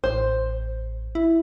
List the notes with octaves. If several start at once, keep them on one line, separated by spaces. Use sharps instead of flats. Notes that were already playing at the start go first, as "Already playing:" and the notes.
A1 C5
E4